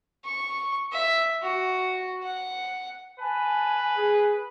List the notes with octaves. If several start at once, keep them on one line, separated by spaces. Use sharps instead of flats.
C#6
E5
F#4
F#5
B4 G#5 A5
G#4